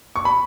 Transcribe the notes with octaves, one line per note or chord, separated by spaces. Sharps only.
C#6
B5